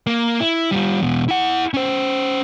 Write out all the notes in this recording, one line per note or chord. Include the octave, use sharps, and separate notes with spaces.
A#3
E4
G3 F4
E2 B2
E4 F#5
C#4 C5